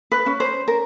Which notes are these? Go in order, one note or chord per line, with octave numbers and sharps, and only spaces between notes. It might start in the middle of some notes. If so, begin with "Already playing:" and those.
B4
C#4
C5
A#4